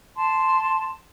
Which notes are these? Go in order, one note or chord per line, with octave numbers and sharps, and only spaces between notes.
A5 C6